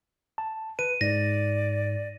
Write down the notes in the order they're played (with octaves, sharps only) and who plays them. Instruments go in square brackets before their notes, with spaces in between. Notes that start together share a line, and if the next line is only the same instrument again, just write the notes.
[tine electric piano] A5
[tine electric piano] B4 [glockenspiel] D#7
[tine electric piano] G#2 [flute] D5 [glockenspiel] A#6